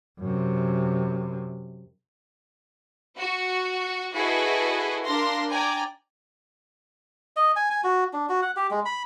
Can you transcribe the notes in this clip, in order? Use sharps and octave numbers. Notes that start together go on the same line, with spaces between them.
F#2 C3
F#4
E4 F#4 G#4 A4 B4 D#5
D4 A#4 F5 C6 A#6
D5 G5 G#5 A#5
D#5
G#5
G#5
F#4
D4
F#4
F#5
G4
G#3
B5